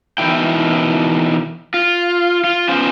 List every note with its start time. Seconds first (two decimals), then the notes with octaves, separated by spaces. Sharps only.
0.18 B2 D#3 E3 E4 G5
1.74 F4
2.44 F4
2.69 B3 C#4 F4 C5